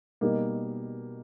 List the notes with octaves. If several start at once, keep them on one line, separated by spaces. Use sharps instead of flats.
B2 G3 A#3 D#4